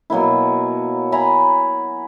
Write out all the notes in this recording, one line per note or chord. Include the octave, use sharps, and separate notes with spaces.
B2 F#3 A#3 E4
E5 G#5 A#5 B5